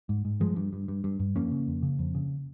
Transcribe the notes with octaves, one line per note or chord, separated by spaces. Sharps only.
G#2
G#2
G2 F3 G#3
G2
G2
G2
G2
G2
F2 A#3 C#4
C#3
F2
C#3
F2
C#3